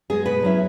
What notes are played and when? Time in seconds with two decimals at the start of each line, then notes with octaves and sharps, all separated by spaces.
0.10 G#3 B3 G#4
0.26 B2 B4
0.43 F#3 C#4 E4